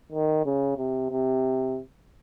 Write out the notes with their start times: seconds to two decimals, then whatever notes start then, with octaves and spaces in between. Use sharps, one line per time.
0.12 D#3
0.45 C#3
0.77 C3
1.10 C3